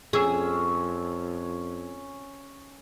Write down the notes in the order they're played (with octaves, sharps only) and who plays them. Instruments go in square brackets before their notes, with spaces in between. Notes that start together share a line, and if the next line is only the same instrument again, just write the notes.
[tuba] F2 [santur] C#4 E6 [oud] G#4